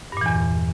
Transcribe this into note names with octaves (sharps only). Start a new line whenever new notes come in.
E2 G2 A#2 E3